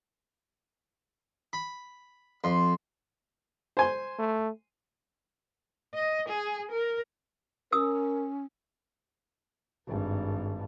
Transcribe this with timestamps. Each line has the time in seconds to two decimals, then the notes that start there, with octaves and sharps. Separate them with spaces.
1.53 B5
2.44 F2 C6
3.77 C5 G#5 C6
4.19 A3
5.94 D#5
6.29 G#4
6.71 A#4
7.72 C#4 A#4 D#6 E6
9.88 G#1 G2